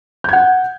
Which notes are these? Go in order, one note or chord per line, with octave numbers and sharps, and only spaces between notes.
F#5 G6 G#6